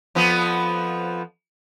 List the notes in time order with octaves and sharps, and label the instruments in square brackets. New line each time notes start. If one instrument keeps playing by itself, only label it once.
[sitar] F2 F3 B3